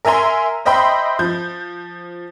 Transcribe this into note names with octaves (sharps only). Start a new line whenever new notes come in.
A#4 E5 G#5 A#5 C6
C5 D#5 E5 G5 B5 C6
F3 G6